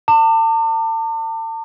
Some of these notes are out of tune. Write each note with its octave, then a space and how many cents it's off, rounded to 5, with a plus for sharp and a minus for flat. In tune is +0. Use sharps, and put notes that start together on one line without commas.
A5 +40 D6 +30